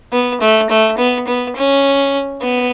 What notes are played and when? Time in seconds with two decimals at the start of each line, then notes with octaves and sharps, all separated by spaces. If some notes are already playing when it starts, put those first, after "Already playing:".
0.13 B3
0.40 A3
0.70 A3
0.98 B3
1.27 B3
1.56 C#4
2.41 B3